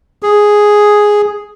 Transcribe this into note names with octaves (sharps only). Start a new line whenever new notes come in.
G#4